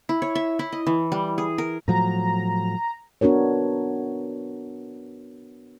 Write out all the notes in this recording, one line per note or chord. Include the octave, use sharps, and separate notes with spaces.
E4
C#5
E5
E4
D#5
E3
G3
G#4
A#4
A2 F3 F#3 A#5
B3 D4 F#4 A#4 C#5